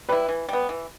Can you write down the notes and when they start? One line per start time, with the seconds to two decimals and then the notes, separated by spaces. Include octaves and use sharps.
0.09 G3 E4 B4
0.28 E3
0.49 G3 B3
0.69 E3